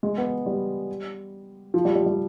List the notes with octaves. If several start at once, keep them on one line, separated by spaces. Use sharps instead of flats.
G#3
B3
G3
F3
G3
G3
G3